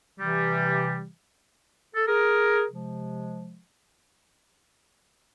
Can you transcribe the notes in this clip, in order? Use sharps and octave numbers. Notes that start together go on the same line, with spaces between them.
C3 E3 G3
A4
G#4 A#4
C3 F3 G#3